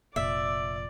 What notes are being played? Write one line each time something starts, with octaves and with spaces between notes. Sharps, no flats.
F1 A#2 D5 E5